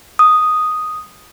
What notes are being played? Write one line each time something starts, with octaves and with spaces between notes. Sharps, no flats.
D#6